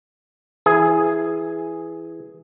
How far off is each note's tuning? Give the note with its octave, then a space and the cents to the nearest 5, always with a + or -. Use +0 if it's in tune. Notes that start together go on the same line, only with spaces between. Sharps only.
E3 +0 G#4 +0